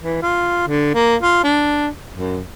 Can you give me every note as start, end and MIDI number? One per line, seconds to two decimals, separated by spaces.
0.01 0.22 52
0.22 0.66 65
0.68 0.92 50
0.95 1.16 58
1.23 1.40 65
1.44 1.88 62
2.14 2.41 42